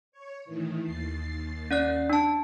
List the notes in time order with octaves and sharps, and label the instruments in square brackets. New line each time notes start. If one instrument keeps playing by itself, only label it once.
[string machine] C#5
A2 D#3 E3
D#2 A6 C7
[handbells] C#4 D5 F#6
D4 A5